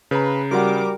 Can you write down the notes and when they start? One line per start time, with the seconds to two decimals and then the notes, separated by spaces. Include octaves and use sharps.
0.11 C#3 B4 A#5
0.51 G3 E4 F#4 A#4 F#5 D6